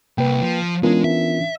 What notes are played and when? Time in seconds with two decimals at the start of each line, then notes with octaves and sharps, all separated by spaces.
0.18 C2 A#3 B4 G5
0.42 F3
0.83 E3 G#3 B3 C#4 D4 F4 A#4
1.04 E5